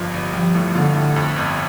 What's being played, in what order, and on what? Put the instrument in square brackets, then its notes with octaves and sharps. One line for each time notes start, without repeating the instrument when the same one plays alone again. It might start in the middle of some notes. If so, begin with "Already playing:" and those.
Already playing: [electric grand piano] G1 G2 F3
G1
[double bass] F3 [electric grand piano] G3
[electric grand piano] A2
[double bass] D3 [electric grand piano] F4
[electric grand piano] A2
F2
G1